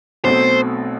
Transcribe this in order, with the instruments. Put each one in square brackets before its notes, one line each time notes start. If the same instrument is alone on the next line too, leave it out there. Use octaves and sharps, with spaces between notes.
[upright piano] B1 B2 A3 C4 [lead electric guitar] C5